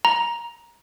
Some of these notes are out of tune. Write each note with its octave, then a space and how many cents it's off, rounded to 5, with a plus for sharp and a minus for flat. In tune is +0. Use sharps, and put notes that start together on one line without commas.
A#5 +15